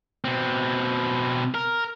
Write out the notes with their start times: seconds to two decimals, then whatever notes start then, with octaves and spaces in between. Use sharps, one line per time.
0.25 B2 C4
1.54 A#4